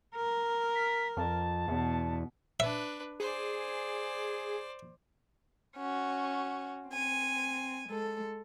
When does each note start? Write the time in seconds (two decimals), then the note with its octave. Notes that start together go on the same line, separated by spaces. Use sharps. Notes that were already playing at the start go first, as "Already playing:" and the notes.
0.16 A#4
0.75 B6
1.17 F2 A5
1.68 E2 B2
2.60 D4 B4 E5
3.20 G#4 C5 D5
5.76 C#4 F#4
6.88 C4 G#5
7.87 G#3 A4